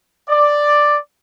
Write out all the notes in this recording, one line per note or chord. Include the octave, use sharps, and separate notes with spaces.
D5